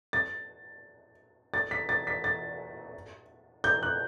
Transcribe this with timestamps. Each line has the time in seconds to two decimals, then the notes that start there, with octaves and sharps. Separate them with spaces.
0.13 A6
1.54 A6
1.71 B6
1.89 A6
2.07 B6
2.24 A6
3.64 G6
3.83 F#6